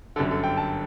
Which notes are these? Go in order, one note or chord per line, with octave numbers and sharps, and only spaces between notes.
G1 F#2 D3 A4
A4
G5
A5